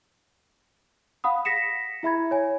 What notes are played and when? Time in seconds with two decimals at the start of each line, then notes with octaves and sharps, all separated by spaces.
1.24 F5 F#5 B5 D#6
1.45 A#6 B6 C#7 E7
2.03 E4 E5 B5 G#6
2.31 C#5 G#5